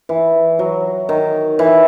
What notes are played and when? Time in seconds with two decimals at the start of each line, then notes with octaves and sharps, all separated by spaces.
0.09 E3
0.59 F#3
1.09 D#3
1.59 E3